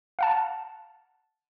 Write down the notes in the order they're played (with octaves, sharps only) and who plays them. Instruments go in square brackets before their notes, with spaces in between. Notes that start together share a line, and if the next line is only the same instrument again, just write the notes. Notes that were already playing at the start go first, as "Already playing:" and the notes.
[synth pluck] F5 F#5 A5